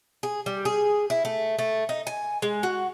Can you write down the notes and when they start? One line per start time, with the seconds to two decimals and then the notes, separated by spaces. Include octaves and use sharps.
0.23 G#4
0.46 G3
0.65 G#4
1.10 E4
1.25 A3
1.59 A3
1.89 D#4
2.07 G#5
2.42 G#3
2.63 F#4